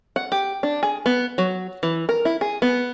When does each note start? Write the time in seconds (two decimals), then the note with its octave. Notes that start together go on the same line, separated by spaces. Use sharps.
0.16 F#5
0.32 G4
0.63 D4
0.83 G#4
1.06 B3
1.38 F#3
1.83 E3
2.09 A#4
2.25 E4
2.41 G#4
2.62 B3